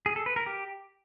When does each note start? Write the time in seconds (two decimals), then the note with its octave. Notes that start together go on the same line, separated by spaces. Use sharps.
0.06 G#4
0.16 A4
0.26 B4
0.36 A#4
0.46 G4